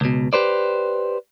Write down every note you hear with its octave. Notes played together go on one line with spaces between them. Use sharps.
C#2 B2
G4 B4 C5 D5